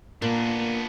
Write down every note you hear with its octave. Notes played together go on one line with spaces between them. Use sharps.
A#2 A#3 B3 D4